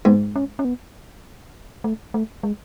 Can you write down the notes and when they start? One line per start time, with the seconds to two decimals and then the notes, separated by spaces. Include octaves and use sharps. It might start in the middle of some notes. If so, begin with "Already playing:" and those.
0.05 G#2 B3
0.36 C#4
0.59 C#4
0.65 B3
1.84 A3
2.14 A3
2.43 G#3